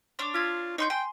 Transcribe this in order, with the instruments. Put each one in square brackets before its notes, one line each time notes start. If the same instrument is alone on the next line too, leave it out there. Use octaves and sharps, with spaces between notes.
[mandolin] D4 C#5 [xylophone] C6 D6
[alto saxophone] F4 [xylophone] E6 G#6 B6
[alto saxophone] D#4 [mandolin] C#5 C6 G6
[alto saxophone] G5 [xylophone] G#5 [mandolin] C6